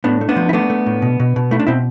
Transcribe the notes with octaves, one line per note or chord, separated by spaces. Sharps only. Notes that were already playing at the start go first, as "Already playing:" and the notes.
A2 B3 D4
A3
B3 D4
F3
E4
A3 B3 D4
A3
A2
B2
B2
B2
A3 E4
D4
B2 C4 E4